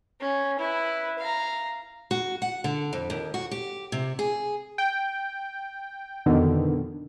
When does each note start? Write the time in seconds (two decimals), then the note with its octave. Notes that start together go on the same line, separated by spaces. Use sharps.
0.21 C#4
0.59 E4 B4
1.19 F5 A#5
2.11 F#4
2.42 F#5
2.64 D3
2.93 F2
3.10 D#2
3.34 F#4
3.51 G4
3.92 C3
4.19 G#4
4.78 G5
6.26 F2 B2 D3 D#3